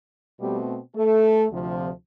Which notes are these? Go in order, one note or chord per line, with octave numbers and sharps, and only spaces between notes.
B2 G3 A3 C4 G4
A3 A4
D2 C3 F3